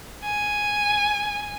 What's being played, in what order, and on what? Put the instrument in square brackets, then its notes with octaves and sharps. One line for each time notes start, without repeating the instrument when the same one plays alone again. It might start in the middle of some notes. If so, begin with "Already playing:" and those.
[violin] G#5